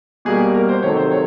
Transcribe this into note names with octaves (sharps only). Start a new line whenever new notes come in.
B2 G3 A#3 G#4
A#4
C5
C3 D#3 F#3 A3 C#5
C5
C#5